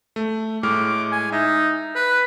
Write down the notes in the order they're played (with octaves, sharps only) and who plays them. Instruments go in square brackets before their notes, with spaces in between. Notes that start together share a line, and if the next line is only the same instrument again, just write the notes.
[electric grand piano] A3
[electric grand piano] A2 G#3 F6 [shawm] D6
[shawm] G#5
[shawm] D#4 [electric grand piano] E5
[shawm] B4